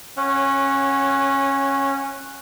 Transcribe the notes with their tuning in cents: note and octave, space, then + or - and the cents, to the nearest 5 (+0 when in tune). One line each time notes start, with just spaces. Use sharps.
C#4 -15 C#5 +0 F#5 +0